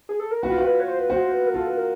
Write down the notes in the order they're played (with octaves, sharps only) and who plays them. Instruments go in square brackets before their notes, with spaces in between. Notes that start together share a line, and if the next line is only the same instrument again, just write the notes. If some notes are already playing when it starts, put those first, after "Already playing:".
[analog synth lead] G#4
A4
A#4
[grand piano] F#4 [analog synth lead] B4
[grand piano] F4
F#4
[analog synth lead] B4
C#5
C5
B4
[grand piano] F#4 [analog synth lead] C5
[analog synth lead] B4
A#4
[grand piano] F4 [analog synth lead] A4
[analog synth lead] B4
A#4